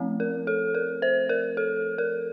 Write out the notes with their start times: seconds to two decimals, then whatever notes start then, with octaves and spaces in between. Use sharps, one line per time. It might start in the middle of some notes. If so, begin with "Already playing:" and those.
Already playing: F3 A3 C4
0.20 A#4
0.47 A4
0.75 A#4
1.02 C5
1.29 A#4
1.57 A4
1.98 A#4